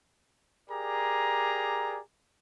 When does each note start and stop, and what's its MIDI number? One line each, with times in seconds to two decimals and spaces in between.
0.69 1.99 67
0.69 1.99 68
0.69 1.99 70
0.69 1.99 74
0.69 1.99 82